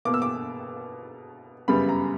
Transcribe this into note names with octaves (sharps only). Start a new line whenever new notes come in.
B2 A#3 D6
E6
D6
F#2 C#3 G3 B3 B5
A#5